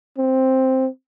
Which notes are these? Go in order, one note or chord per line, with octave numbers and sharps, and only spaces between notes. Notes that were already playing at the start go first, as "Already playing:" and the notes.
C4